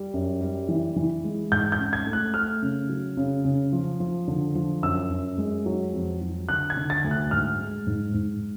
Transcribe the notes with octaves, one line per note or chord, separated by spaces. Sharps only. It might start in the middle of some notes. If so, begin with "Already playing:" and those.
Already playing: G3
F#2
G3
E3
E3
G#3
G#2 G6
G6
C#4
G#6
A3
F#6
A3 F6
C#3
F#3
C#3
C#3
F3
F3
D3
F3
F#2 E6
F#2
G#3
F#3
F2
F#3
D3 F#6
G#6
D3
A6
D2
F#6
G#2 F6
G#3
G#2
G#2